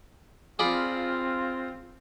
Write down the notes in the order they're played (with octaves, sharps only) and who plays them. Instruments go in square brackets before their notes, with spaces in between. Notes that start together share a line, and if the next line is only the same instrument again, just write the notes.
[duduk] C4 [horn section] F4 [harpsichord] G#4 D5 B5